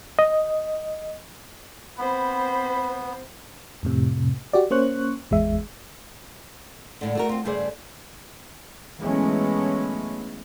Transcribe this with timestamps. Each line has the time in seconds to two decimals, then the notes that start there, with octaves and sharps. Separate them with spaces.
0.19 D#5
1.99 B3 C4 C5 B5
3.83 F2 A2 C3
4.53 F#4 G4 D5
4.71 A#3 C#4 C5 C#6 F#6
5.31 G#1 E2 G#3 E5
7.01 D2 A2 D3
7.15 A3 F#4 A#4
7.29 C4 F4
7.45 G2 C#3 A3 G#4 C5 D5
9.00 E3 F#3 G#3 A3 B3 C#4